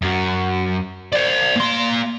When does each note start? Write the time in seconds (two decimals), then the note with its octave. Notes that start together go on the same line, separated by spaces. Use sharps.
0.02 F#2
1.13 C5 D5
1.56 A#3 C6